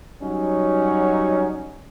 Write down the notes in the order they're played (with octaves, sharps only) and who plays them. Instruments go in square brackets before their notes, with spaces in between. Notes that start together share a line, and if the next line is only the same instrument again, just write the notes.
[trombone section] F#3 G3 C#4 D#4